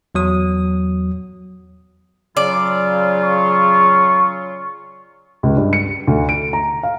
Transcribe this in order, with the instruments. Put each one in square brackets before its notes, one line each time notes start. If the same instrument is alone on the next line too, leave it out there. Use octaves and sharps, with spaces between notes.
[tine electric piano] E2 F#3 D#6
[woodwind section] C#3 F#3 F4 [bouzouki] D5
[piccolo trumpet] C#6
[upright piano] C#2
G2
C#7
D2
D7
A#5
F5